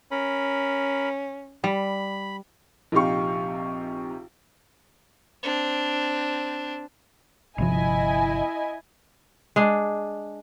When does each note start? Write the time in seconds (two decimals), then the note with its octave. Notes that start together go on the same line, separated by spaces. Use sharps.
0.11 C#4 A#4 B5
1.64 G3 B5
2.92 A#1 C3 D#4 G4 F5 C#6
5.43 C4 D4
7.58 G1 C3 F3 E4 D#5 G#5
9.56 G#3 D4